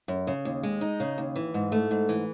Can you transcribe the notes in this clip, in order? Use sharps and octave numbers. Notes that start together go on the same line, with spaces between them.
F#2
C#3
D#2
G#3
D#4
C#3
D#2
E3
G#2
A3
G#2
E3